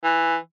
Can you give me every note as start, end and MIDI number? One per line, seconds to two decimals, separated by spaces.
0.04 0.36 52